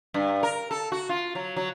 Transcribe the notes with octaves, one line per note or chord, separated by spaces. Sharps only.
G2
A#4
A4
F#4
F4
F#3
F#3